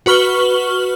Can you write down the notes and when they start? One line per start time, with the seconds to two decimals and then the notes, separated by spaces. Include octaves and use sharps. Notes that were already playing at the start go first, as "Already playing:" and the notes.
0.06 F#4 B4 C#6 F6 F#7 G7